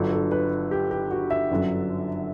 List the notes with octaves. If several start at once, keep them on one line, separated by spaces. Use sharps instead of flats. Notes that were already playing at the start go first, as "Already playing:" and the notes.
Already playing: G1 G2 F#3 A4
A4
B4
G4
G4
F#4
E5
G1 F#2 D3 F#3